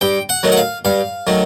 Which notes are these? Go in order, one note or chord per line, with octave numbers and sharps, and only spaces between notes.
G2 G5
F#5
D#3 F#3 A3
F#5
F5
G2 F5
D#3 F#3 A3